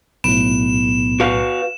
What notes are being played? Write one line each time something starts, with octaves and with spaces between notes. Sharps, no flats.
B1 A2 B3 E7
F#4 B4 F5